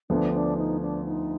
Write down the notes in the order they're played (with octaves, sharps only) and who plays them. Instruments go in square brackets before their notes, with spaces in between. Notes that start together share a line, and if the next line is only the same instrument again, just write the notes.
[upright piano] D2 D3 F3 B3 [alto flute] D4
[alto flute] D4
D#4
D4
D#4